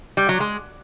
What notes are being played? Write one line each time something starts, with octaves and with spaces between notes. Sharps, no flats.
G3
F#3
G#3